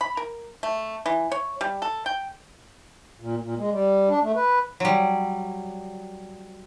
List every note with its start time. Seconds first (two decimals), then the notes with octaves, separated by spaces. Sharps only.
0.01 B5
0.17 A#4
0.63 A3
1.06 E3
1.32 C#5
1.61 G3
1.82 A4
2.06 G5
3.20 A#2
3.42 A#2
3.58 G#3
3.72 G3
4.09 D4
4.23 A3
4.36 B4
4.80 F#3 G3